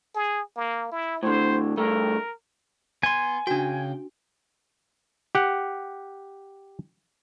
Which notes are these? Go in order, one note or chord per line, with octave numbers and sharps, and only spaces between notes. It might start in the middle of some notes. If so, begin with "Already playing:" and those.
G#4
A#3
E4
A2 D3 C5
G2 A3 A#4
B3 G#5 C6
C#3 D4 F#4 G5
G4 F#5